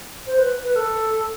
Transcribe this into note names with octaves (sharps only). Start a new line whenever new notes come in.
C5
B4
B4
A4